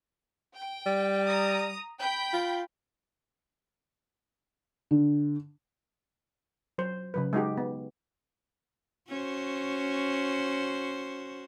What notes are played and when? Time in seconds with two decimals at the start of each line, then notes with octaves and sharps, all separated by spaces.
0.54 G5
0.86 G3
1.25 A#5 D#6
2.00 G5 B5 G6
2.33 F4
4.91 D3
6.78 F#3 C5
7.14 C#3 F#3 B4
7.33 G#3 D#4 F#4 G4
7.58 B3
9.09 C#4 F#4 C5